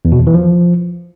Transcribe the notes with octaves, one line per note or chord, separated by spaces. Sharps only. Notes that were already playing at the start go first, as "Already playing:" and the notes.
E2
B2
E2
E3
F3